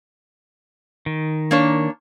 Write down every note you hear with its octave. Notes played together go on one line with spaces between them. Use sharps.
D#3
A#3 D4 C#5